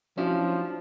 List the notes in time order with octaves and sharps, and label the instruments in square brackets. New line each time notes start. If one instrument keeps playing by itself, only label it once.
[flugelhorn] F3 [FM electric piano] F#3 D4 [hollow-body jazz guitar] C#4 E4